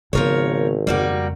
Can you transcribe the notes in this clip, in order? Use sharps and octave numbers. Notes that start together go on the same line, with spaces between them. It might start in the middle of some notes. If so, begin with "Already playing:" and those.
G#1 C#3 F3 B3 A#4 C#5
F2 C#3 G3 A#3 F#4